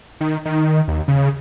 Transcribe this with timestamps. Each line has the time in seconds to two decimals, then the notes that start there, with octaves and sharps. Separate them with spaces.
0.21 D#3
0.45 D#3
0.88 D#2
1.08 C#3